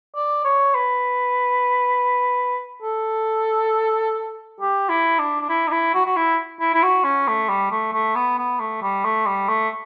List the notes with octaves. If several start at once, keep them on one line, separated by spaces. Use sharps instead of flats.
D5
C#5
B4
A4
G4
E4
D4
D4
E4
D4
E4
F#4
F#4
E4
E4
E4
F#4
C#4
A3
G3
A3
A3
B3
B3
A3
G3
A3
G3
A3